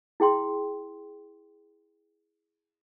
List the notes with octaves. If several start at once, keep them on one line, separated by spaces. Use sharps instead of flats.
E4 G#4 G5 C6